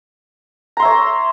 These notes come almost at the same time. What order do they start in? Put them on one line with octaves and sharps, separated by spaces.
A#5 C6 E5 C#5